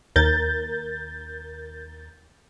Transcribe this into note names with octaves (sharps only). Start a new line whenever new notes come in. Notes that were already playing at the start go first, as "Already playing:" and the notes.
D#2 A#4 G6 A6